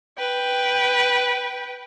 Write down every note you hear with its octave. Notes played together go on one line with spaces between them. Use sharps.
B4 G5